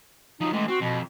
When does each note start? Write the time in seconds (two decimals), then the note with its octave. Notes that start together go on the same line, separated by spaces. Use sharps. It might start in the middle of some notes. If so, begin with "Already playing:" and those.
0.41 F3 F#3 D#4
0.53 A2 E3 G#3
0.68 C4 F#4
0.81 F2 B2